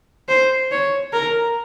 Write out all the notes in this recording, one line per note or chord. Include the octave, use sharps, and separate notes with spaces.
C5
C#5
A#4